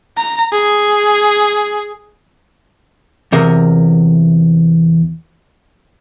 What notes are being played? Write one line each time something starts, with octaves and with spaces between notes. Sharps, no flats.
A#5
G#4
E2 C3 A#4